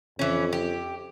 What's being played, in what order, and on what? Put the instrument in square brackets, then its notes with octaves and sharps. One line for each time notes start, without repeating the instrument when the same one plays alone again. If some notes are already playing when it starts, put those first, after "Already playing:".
[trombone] F2 [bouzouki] E3 C#4
[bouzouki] G4